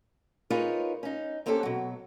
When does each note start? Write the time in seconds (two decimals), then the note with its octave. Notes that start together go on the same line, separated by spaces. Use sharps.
0.50 D#4 F4 G#4 A#4 B4 C#5
1.03 C#4 D#4
1.46 A#3 C4 C#4 G4 A4
1.63 B2 F#3